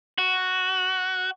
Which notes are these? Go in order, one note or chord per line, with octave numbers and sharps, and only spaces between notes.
F#4